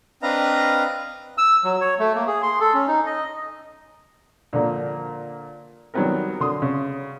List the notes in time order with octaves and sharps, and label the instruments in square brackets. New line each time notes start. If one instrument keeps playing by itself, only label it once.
[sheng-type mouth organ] C4 D4 B4 D#5 F5 A#5
[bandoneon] E6
F#3
C#5
A3
A#3
G#4
C6
A4
C#4
D#4
D#5
[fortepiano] A#2 D3 F3 A#3
D#3 F#3 G3 B3 C4 A#4
D3 C6 D#6
C#3